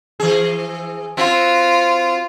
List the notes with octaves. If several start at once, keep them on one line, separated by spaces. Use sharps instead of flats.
E3 G#4
C4 F4 F#4